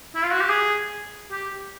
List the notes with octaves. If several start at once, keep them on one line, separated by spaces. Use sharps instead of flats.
E4
F4
F#4
G4
G#4
G4